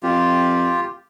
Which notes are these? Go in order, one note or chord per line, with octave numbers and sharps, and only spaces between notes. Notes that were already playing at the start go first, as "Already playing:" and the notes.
F2 F4 G4